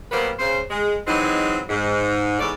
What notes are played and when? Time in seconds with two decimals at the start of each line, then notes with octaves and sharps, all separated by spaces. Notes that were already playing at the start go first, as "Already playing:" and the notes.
0.11 F#3 G3 A#3 B3 B4 C5
0.39 C#3 C5
0.70 G#3
1.06 E3 F#3 G#3 C4 D#4
1.69 G#2
2.39 E2 G#2 A3 C#5 D5